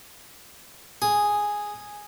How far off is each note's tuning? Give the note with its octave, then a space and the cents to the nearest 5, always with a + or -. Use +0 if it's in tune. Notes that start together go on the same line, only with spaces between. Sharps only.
G#4 -5